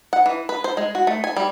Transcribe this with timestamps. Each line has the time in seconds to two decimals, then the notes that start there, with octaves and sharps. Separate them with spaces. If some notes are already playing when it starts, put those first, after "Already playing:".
0.13 F#5
0.26 E3
0.49 B4
0.64 C5
0.77 G#3
0.95 F#4
1.07 A3
1.24 G#5
1.37 G3